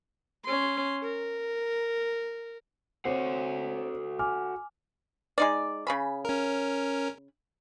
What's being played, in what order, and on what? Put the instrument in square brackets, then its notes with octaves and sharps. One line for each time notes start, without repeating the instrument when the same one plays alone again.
[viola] C#4 C6
A#4
[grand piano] C4 C#5 [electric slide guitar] F#4 A4 F#5 [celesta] C7
[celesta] G#5 D6 [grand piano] F6
[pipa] G#3 D#4 D5
C#3 G#4 B5
[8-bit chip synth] C#4 A#4